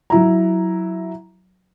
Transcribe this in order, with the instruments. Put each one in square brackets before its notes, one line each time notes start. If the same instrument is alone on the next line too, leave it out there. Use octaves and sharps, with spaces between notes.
[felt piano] F#3 E4 A#5